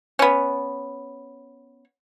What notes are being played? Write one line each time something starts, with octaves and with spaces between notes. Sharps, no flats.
B3 C#4